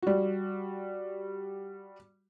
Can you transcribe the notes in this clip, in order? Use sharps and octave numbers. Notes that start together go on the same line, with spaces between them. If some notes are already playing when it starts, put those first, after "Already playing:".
G3 F#4